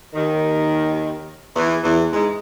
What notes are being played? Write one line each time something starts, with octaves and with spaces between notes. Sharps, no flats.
D#2 D#3
E2 E3
E2 E3
G#2 G#3